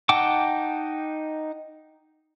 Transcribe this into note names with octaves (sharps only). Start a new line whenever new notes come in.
D#4 F#5 G5 A5 D6